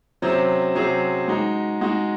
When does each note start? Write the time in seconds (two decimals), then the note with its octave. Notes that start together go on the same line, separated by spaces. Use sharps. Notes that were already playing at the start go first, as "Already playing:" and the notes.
0.22 C3 F#3 C#4 G#4 C5
0.75 C3 F#3 C#4 G#4 C5
1.28 G#3 D#4 F#4
1.81 G#3 D#4 F#4